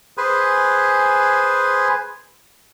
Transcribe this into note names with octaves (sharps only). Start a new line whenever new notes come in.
G#4 B4 C5 G#5